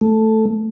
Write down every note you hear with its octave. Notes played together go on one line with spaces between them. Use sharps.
A3